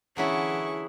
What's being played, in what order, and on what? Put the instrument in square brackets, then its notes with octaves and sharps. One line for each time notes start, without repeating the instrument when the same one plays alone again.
[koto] D3 F#3 B3 [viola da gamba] E3 E4 [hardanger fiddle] C#4 C#6 [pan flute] G#4